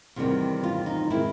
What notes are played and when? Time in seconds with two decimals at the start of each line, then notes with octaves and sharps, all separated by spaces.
0.16 E2 C3 D#3 G3
0.63 F4
0.86 D#4
1.10 D#3 G#3 C4 E4